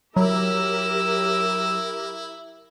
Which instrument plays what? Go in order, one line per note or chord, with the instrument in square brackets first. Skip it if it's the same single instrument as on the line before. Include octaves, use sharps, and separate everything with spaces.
[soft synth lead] F#3 [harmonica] E4 [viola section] G4 A#4 [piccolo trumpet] E6